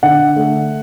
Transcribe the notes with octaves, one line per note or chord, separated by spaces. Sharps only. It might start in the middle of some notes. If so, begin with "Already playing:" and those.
D3 F#5
A3